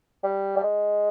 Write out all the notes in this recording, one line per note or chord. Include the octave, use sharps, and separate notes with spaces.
G3
G3
G#3